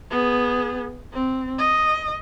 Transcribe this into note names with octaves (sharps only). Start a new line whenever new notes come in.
B3 G#4
C4
D#5